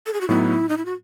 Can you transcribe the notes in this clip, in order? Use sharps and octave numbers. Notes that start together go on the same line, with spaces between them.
A4
G#4
F#4
A2 F#3 B3 D#4 E4
D#4
E4
F#4